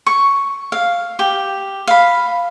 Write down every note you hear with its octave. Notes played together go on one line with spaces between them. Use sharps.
C#6
F5
G4
F5 B5